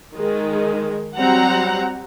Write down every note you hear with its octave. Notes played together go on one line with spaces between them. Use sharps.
D#3 G#3
F#3 G3 C4 F#5 A#5